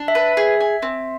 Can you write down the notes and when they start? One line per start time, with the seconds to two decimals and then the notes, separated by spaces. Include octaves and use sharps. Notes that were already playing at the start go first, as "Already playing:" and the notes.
Already playing: D4
0.08 E5
0.15 B4
0.37 G#4
0.60 G#5
0.82 C4